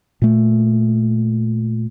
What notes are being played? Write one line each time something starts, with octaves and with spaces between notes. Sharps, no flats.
A#2 A3